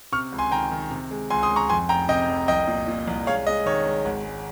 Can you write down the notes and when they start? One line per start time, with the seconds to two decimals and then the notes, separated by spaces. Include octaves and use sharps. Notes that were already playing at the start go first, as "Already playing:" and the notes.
0.12 C3 C#6 F6
0.32 C#2
0.38 G#5 C6
0.51 D#3 G5 A#5
0.71 D#3
0.91 C3
1.11 G#3
1.30 C#2 G#5 C6
1.43 C6 D#6
1.51 G#3
1.56 A#5 C#6
1.69 F2 G#5 C6
1.89 F1 G5 A#5
2.09 C3 D#5 G5
2.29 F1
2.48 C2 D#5 G5
2.68 A#2
2.88 A#2
3.08 C2
3.27 G#3 C#5 F5
3.47 G#3 D#5
3.66 D#3 C#5
3.86 G#3
4.05 G#1
4.24 G#3